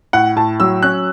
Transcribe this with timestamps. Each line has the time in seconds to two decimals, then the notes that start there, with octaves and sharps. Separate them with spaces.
0.13 A2 F#5
0.36 A2 A5
0.60 F#3 E6
0.83 C#4 F#6